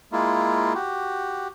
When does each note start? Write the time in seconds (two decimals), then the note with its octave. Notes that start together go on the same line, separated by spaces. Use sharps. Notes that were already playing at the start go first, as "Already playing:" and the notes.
0.12 G#3 A#3 E4 F4
0.74 F#4 G4